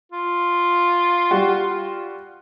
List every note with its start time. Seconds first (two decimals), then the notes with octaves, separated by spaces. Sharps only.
0.11 F4
1.31 G3 F#4